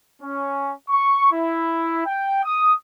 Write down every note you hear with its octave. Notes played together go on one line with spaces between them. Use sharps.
C#4
C#6
E4
G5
D#6